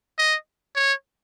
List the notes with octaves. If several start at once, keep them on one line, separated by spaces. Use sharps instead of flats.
D#5
C#5